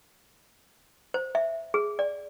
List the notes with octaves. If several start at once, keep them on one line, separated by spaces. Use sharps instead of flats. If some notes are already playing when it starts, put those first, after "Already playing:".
C5
E5
G#4
D5